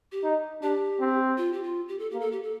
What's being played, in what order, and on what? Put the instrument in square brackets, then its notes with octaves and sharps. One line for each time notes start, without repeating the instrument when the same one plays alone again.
[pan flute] G4
[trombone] D#4
[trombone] D4 [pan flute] G4
[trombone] C4
[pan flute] F4
G4
F4
G4
A4
[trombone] A#3 [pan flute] G4
[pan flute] A4
G4
A4